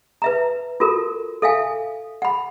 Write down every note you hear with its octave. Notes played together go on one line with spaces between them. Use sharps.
B4 E5 A#5
F4 F#4 A4 A#4
A4 E5 F5 G#5
F#5 B5